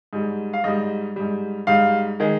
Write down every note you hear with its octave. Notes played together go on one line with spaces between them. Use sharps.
G#2 G3
F5
G#2 G3 D#5
G#2 G3
G#2 G3 F5
D#3 G#3